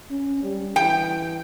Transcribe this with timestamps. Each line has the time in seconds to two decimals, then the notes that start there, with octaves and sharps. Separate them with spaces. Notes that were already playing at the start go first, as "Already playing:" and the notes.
0.10 C#4
0.43 G3
0.76 E3 G5